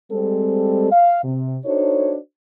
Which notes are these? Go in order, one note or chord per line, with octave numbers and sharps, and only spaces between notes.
G3 G#3 C4 A4
F5
C3
D4 D#4 F#4 A4 C5 C#5